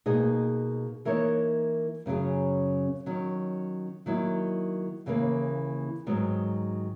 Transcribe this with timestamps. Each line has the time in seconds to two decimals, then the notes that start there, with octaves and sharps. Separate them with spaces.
0.06 B2 A#3 D#4 G#4 D#5
1.05 E3 A#3 D#4 A#4 C#5
2.06 F#2 C#3 F#3 C#4 G#4
3.06 D#3 F#3 C#4
4.06 D#3 F#3 A#3 E4
5.06 D#2 C#3 E3 A#3
6.07 G#2 D#3 F#3 B3